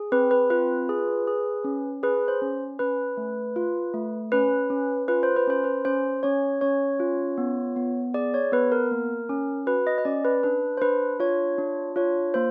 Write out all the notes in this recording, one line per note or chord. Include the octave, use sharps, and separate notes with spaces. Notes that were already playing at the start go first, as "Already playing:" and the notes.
Already playing: G#4
C4 B4
B4
F4 B4
G#4
G#4
C#4
G#4 B4
C5
C#4
C#4 B4
A3
F4
A3
C#4 B4
C#4
F4 B4
C5
B4
C#4 C5
B4
C#4 C5
C#4 C#5
C#4 C#5
F4
B3
B3
G#4 D5
C#5
B3 B4
A#4
A#3
C#4
F#4 B4
D#5
D#5
C#4 D5
B4
D4 B4
C5
D4 B4
F4 C#5
D4
F4 C#5
A#3 C5